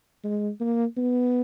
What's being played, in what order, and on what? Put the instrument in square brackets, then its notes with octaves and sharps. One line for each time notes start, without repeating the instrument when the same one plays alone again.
[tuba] G#3
A#3
B3